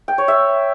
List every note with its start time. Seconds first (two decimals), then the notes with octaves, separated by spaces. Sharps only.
0.08 G5
0.18 C#5
0.28 E5